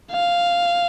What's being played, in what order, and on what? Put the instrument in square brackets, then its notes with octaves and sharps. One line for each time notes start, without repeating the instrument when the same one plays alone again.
[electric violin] F5